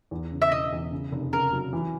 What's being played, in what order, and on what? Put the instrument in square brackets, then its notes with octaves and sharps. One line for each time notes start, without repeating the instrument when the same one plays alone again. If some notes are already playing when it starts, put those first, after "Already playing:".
[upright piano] E2
C#3
[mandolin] E5
[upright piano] E1 [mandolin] D#5
[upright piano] E2
C#3
F1
[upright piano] C#3 [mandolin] A#4
[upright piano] F#3
E3